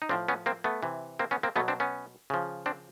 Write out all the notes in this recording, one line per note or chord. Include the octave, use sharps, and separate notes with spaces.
D#4
A2 F3 C4 D4
B3 C#4
A#3 C4
A3 B3
C3 E3
A#3 C4
B3 C#4
A#3 C4
B2 F#3 A3 B3
C4 D4
B3 C#4
C#3 F3
C4 D4